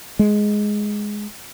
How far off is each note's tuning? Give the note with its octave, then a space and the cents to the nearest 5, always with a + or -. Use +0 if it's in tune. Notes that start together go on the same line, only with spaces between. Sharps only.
G#3 +5